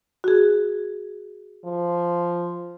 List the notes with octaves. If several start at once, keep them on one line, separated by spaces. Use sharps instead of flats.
F#4 G#4
F3